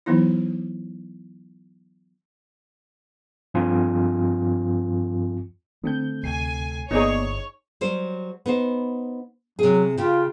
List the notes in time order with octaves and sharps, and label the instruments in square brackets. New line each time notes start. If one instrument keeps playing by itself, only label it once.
[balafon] E3 F#3 B3 D#4 E4
[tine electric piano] G2 F3 C4 F4 G#5
[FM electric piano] D3 C4 G6 [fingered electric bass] A3
[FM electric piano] D2 C3 C7 [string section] G#5
[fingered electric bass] G1 [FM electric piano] A#3 B3 D5 [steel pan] D#4 G#4 [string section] C#5
[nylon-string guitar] F#3 G3 C5
B3 D#4 C5
[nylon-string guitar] C3 G#4 [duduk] F#3
[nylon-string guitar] C#3 G4 [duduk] F4